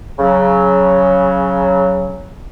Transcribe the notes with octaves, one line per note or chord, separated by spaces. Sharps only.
C#3 F#3